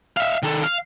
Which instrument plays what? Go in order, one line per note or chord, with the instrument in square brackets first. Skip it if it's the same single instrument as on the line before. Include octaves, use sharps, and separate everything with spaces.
[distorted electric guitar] E5 F5
D#3 A4
F5